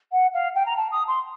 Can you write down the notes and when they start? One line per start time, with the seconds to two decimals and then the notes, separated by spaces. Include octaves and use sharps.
0.12 F#5
0.34 F5
0.55 G5
0.66 A#5
0.76 A5
0.92 D#6
1.08 C6